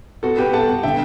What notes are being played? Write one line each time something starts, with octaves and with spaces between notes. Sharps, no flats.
B3 F#4 A4
B3 G4 B4
A4 F#5 A5
B3
D3 E5 G5